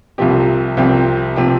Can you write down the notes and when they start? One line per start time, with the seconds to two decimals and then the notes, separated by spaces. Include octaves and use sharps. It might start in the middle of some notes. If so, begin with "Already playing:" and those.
0.18 C2 C3 F3 C4 G4
0.77 C2 C3 F3 C4 G4
1.36 C3 F3 C4 G4